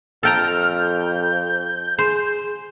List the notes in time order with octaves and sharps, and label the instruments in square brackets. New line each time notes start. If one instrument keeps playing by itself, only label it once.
[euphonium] F2 [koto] A4 G5 A#5 [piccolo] F6
[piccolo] G6
[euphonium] G#4 [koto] C5